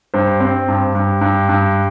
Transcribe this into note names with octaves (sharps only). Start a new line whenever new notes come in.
G2 C5
C4
G2
G2
G2
G2